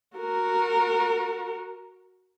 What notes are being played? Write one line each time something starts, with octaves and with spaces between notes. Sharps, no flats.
F#4 A#4